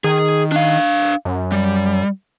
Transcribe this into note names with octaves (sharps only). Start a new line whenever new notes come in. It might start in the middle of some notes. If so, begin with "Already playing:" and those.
D#3 G#4
D4 F5
F#2
G3